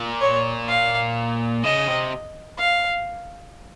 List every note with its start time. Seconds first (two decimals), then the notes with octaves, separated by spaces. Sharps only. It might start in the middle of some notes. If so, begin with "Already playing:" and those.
Already playing: A#2
0.21 C#5
0.68 F5
1.64 C#3 D#5
1.87 C3
2.59 F5